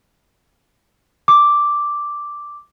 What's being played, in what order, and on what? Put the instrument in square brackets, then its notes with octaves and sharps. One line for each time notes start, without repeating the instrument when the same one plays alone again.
[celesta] D6